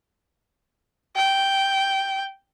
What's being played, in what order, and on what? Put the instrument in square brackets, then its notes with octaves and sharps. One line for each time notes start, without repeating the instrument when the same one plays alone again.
[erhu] G5